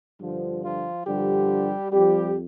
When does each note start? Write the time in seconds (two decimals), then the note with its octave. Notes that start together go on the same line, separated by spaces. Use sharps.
0.20 G2 D3 F3
0.63 F3 F4
1.06 G2 D3 F3 G3 G4
1.92 F2 F3 G3 G4